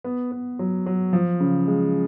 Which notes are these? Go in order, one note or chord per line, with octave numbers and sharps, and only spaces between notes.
B3
B3
F#3
F#3
F3
C#3
G#3